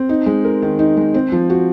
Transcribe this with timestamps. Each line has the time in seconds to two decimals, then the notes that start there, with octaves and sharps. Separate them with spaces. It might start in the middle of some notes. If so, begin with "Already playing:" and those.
Already playing: C4
0.09 D#4
0.26 G#3
0.44 A#4
0.62 D#3
0.79 D#4
0.97 G#3
1.14 C4
1.32 F3
1.50 F#4